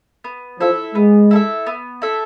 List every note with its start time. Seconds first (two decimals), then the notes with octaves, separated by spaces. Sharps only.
0.24 B3
0.60 F3 E4 A4 E5
0.95 G#3 B3
1.31 E4 A4 E5
1.67 B3
2.02 E4 A4 E5